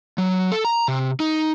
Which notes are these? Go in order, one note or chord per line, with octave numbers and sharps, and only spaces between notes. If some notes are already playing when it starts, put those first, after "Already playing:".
F#3
A4
A#5
C3
D#4